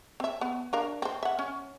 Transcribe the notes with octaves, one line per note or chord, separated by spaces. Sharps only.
C4 E5
B3
D4 A#4 F5
C4 C5
E5 F#5
C#4